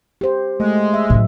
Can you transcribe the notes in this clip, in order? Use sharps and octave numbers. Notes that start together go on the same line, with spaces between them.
G4 C5
G#3 A3
E5
A2 F#3